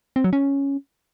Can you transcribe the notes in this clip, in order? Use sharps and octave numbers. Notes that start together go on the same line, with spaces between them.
C4
F#3
C#4